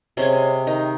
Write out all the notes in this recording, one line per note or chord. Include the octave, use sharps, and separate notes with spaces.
C3 G#3 C#4 G#5
D#3 D#4